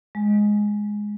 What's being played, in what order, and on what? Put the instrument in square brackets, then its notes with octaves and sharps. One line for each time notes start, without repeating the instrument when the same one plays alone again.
[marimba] G#3